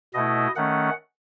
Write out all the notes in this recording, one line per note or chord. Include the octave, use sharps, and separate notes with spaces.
B2 A3 E4 D#5
D#3 A3 C#4 F#5